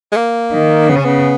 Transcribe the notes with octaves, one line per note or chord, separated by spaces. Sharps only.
G#3
A#3
D#3
C#3 B3
C#4
B3